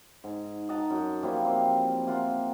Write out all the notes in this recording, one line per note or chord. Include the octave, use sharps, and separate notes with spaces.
G#2
D#5 F#5 A5 A#5
F#2
F3 G3 A#3 E4
A#3 C4
A#3 F4 E5 F#5